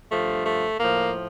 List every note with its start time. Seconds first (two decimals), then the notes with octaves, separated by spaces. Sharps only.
0.11 G2 F3 A3
0.46 A3
0.79 A2 F3 A#3